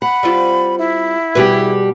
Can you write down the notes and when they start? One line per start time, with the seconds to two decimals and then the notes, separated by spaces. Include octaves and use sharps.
0.02 F#5 B5
0.23 G3 C4 F4
0.79 E4
1.35 B2 G3 G4 G#4 B4